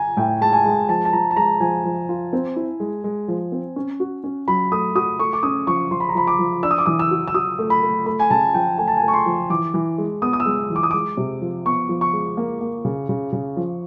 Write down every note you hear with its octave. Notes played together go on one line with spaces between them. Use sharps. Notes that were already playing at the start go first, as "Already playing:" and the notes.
Already playing: G#5 A#5
A2 G5
G#3 A5
G#5
G#3
F3 A5
A5
F3 A#5
A5
G#3 A#5
F3 G#5
F3
F4
C4
E4
G#3
G#3
F3
C4
C#4
F#4
C#4
F#3 B5
A3 D#6
F#4 D#6
A3 C#6
D6
C#4 D#6
F3 C#6
F3 C6
B5
A#5
F3 B5
D6
F3
D4 E6
D#6
D6
E3 D#6
E6
F#4
E6
F#4 D#6
A3
B5
A3
A3 B5
G#5
C#3 A5
F3 G5
A3 G#5
A5
G#5
A3
C#6
C6
F3
E3 D6
E3
G#3
B3 D#6
D#6
E6
G#3
E3
D6
D#6
G#3 D6
C3
F3
B3 C#6
F3
C#6
G#3
A#3
A#3
C#3
C#3
C#3
F3